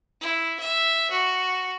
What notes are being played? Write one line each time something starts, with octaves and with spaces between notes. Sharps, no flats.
E4
E5
F#4